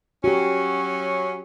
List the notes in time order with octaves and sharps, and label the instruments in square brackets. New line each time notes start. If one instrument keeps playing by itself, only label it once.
[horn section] F#3 C#4 [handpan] F#4 G4